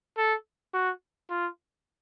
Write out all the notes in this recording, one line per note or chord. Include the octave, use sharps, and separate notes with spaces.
A4
F#4
F4